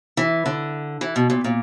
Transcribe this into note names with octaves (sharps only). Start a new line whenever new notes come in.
E3
D3
E3
B2
A#2
A#2